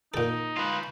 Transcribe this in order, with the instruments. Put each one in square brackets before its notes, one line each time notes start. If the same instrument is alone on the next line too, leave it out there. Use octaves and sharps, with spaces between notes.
[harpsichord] A#2 A4 [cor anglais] D#4
[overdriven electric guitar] F4 B4